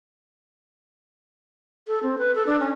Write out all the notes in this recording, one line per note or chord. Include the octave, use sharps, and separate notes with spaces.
A4
C4
B4
A4
D4
C#4